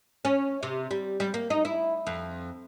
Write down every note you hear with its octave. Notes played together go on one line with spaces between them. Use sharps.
C#4
C3
G3
G3
A#3
D#4
E4
F2